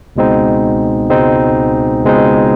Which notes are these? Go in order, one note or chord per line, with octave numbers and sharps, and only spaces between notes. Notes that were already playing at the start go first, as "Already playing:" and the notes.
C#2 B2 G#3 C4 D#4
C#2 B2 G#3 C4 D#4
C#2 B2 G#3 C4 D#4